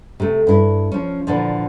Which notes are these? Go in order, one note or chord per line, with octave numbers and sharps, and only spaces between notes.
C3 A3
G2 E4
F3 C#4
A#2 D3 E3 F3